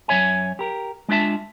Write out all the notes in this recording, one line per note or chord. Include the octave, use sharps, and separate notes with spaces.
F#2 E3 C#5 E5 G#5
G4 A#4
G#3 D4 F4 E5 A5